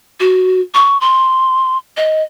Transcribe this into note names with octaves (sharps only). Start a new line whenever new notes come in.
F#4
C#6
C6
D#5